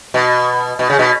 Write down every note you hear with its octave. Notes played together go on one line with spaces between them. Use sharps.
B2
B2
C#3
B2